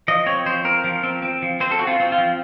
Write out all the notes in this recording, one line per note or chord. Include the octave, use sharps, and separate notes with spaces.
F3 D#5
C4 C#5
F3 C5
C4 A#4
F3
C4
C4
F3
C4 C5
A4
C4 F#4
F4
C4
F4
F3